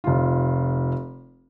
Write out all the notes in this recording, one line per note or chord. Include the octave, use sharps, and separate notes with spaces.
F1 F4